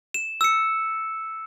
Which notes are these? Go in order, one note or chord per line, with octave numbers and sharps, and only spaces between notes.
E7
E6 C#7